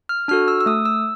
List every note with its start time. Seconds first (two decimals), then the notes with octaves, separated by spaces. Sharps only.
0.09 F6
0.28 D4 F#4 A4 F6
0.48 E6
0.61 E6
0.66 A3 D#6
0.85 E6